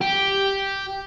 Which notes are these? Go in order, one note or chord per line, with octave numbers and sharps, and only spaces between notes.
G4